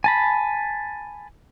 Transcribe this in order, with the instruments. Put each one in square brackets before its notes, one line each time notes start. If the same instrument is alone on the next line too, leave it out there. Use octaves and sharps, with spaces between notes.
[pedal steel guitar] G#5 A5 B5